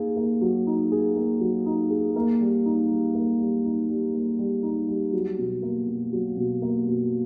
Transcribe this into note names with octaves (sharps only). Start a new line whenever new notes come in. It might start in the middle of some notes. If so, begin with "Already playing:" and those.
Already playing: A#3 D#4 G#4
A#3
F#3
D#4
G#4
A#3
F#3
D#4
G#4
A#3
G3
D#4
G3
A#3
G3
D#4
G3
A#3
G3
D#4
G3
F#3
B2
A#3
B2
F#3
B2
A#3
B2